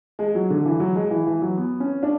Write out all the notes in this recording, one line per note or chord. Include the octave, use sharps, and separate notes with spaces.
G#3
F#3
D3
E3
F#3
G#3
E3
E3
F#3
B3
C#4
D4